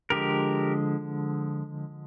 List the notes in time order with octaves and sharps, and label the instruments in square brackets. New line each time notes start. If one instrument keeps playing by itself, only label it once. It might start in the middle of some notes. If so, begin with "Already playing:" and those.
[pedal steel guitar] D3 F3 G#3 G4 A#4